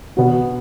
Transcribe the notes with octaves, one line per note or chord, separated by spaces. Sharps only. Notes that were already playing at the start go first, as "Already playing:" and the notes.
B2 B3 F#4